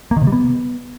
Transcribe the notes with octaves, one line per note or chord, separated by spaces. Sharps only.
A#3
D#3
C3
G3
B3